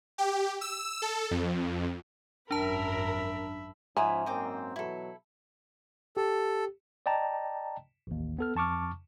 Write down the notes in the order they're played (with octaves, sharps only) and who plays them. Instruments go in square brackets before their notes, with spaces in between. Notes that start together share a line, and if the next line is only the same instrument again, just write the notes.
[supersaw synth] G4
E6
A4
F2
[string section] G#1 F#2 A#4 [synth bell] D4 A5 [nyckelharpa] E5 B5
[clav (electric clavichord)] G#2 [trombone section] F3 C#4 [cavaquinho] E4 E5 D#6 [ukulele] G#5
[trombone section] F#2 A#3 C4 [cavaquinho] D#5 G5 D6
[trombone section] B2 E3 F#3 [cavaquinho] E4 A4
[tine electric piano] G4 [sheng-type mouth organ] A4
[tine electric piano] D5 D#5 G5 A5 A#5
A1 D#2
B3 A4 F6
F2 A5 C#6 D6 F6